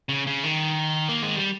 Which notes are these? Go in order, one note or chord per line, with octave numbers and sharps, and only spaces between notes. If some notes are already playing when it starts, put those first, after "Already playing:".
C#3
C#3
D#3
A#3
G#3
G3